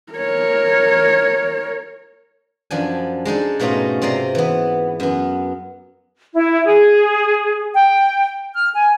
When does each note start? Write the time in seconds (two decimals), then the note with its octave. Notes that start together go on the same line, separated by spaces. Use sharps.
0.13 A#4 C#5
2.71 F#2 F3 D4 G#5
3.25 G#3 D4 D#4 A4
3.60 G#2 B2 A3 C#4 F4 A#5
4.02 C3 C4 D5 D#5 A#5 C6
4.35 E3 B3
5.00 F#2 B3
6.33 E4
6.64 G#4
7.74 G5
8.55 F6
8.73 G#5